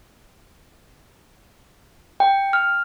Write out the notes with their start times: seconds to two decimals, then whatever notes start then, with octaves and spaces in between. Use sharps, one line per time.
2.20 G5
2.53 F6